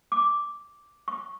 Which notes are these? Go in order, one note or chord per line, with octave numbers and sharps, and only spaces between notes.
D6
C#6